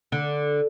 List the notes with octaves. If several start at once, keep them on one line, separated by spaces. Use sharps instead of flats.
D3